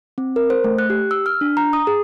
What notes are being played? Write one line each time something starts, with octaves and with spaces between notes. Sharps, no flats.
C4
A#4
C5
A3
F#6
G4
E6
F6
D4
A#5
D#6
G#4